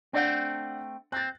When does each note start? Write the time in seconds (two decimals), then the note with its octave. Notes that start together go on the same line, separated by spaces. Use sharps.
0.13 A3 C4 D4 D5 F#5
1.12 C4 F#6 A6